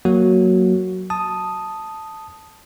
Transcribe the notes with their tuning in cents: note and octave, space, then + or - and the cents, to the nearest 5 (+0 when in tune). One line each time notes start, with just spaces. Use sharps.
F#3 +0 A#3 +0 F#4 +0
A5 +0 D#6 +0